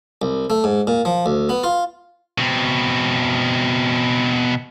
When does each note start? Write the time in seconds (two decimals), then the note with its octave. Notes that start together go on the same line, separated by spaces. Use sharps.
0.22 C2
0.50 A3
0.64 G#2
0.87 A#2
1.05 F3
1.26 D2
1.49 B3
1.64 F4
2.38 B2 C4